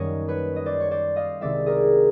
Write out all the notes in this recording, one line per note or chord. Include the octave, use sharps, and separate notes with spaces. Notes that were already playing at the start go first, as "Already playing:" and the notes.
Already playing: F#2 D#3 G3 A#3 C#4 C#5 D#5
B4 C#5
D#5
C5 D5
C#5
C5 D5
D#5 F5
C2 C3 D#3 G#3 C4 D5 E5
G#4 A#4